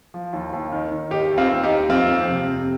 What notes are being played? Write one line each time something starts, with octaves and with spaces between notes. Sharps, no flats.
F3
D#2
D#2
D#3
D#3
D#2 D#4 G4
D#2
C4 F4
D#2
D#4 G4
D#2
F2 C4 F4
F2
C3
C3